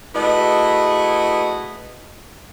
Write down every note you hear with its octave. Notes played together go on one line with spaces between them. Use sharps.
A3 E4 F#4 G#4 B4 D#5